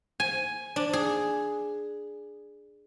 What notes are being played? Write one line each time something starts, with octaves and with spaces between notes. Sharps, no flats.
G#5
D4
G#4